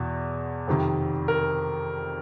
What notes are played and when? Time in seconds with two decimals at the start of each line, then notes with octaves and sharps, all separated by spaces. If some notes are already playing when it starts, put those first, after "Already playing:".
Already playing: E2 B2
0.67 F2 C3 D#3
1.28 A#4